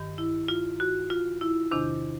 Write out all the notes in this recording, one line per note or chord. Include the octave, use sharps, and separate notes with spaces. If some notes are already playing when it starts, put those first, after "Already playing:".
Already playing: G2 D#3
E4
F4
F#4
F4
E4
E2 C3 D#3 D4